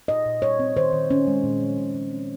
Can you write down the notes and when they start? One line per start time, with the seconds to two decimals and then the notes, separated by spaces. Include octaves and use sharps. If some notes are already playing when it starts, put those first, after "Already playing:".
0.08 A#2 D#5
0.25 A#2
0.42 G3 C#5
0.59 C4
0.77 D#3 C5
0.93 D#3
1.10 A#2 C#4
1.27 G#3
1.44 A#2
1.60 F3
1.78 A#2
1.94 G#3
2.11 C4